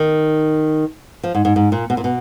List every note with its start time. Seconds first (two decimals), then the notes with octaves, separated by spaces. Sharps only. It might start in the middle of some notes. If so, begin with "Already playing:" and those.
Already playing: D#3
1.23 F3
1.35 G#2
1.45 G#2
1.56 G#2
1.72 A#2
1.90 B2
1.97 A#2
2.04 B2